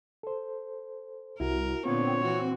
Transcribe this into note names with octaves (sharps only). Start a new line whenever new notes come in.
A4 C5
C2 E4 F#4 A#4
A#2 D3 B3 C4 F4 C#5
E3 F#4